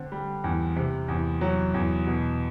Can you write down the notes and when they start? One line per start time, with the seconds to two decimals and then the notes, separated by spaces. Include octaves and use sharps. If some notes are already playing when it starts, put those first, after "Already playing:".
Already playing: D3 C4
0.12 G3
0.44 E2
0.76 C3
1.08 E2
1.41 F#3
1.74 E2
2.07 B2